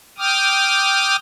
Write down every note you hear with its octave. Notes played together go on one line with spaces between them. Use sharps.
G5 D6 D#6 F6